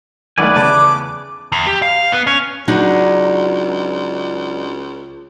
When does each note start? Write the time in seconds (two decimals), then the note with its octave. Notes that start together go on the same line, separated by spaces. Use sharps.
0.38 B1 D#3 A3 B4 D5 G#5
0.55 E2 C#3 A5 D6
1.52 E2
1.67 G4
1.82 F5
2.12 B3
2.27 C#4
2.68 C#2 F#3 D4 D#4